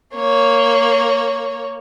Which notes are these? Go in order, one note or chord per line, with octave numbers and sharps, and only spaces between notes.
A#3 C#5